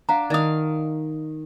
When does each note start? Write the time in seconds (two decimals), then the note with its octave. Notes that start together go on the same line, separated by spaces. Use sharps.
0.09 D4 F5 F#5 A#5
0.30 D#3 D5 D#5 F5 D#6